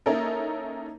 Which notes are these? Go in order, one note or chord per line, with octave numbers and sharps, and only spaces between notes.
A#3 C#4 D#4 E4 A4 A#4